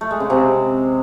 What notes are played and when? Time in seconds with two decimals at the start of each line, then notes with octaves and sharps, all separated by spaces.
0.01 A3
0.11 G#3
0.20 C#3
0.30 C3